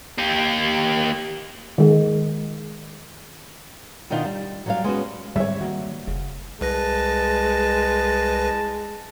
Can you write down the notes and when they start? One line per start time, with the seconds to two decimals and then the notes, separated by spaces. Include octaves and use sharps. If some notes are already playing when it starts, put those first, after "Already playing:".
0.18 A#3 G4
1.78 D#3 G#3
4.10 B2 D#3 D4 D#4 F4
4.26 G3
4.66 F#3 G3 F5
4.84 G#3 B3 C#4 F#4
5.36 G#2 D3 E3 G3 C#5 E5
5.61 D#3 A#3 F#4
6.07 F#1 C#3
6.61 C2 G#3 B4 A5 A#6